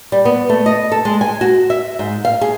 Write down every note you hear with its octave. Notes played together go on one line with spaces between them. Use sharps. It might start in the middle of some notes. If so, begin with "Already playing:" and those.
G3
B3
A3
D#5
A4
G#3
G#5
F#4
E5
G#2
F5
G#4